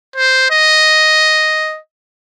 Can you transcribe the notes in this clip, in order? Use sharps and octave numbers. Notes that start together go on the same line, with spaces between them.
C5
D#5